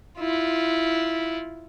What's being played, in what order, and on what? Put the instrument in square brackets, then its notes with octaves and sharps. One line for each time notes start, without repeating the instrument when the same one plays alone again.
[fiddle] E4 F4